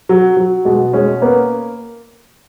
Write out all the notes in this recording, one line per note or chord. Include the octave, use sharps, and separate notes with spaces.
F#3
F#3
B2 G#3
G#3 C#4
A#3 B3